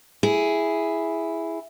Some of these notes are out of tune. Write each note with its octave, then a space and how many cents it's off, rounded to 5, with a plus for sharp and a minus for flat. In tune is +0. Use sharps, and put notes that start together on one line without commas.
E4 +0 G#4 +0